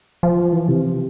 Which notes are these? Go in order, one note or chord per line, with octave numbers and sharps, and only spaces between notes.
F3
E3
C3